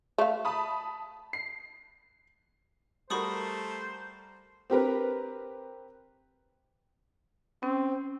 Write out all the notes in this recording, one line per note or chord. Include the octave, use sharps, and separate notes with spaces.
A3 F5
A5 B5 D#6
C7
G3 A3 F#4 A#4 C5 B5 C#6 D#6
C4 G4 A#4 B4
C4 C#4